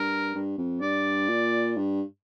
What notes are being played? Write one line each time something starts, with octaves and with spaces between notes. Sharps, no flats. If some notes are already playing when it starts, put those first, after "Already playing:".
Already playing: G2 A#4
G2
F2
G2 D5
A#2
G2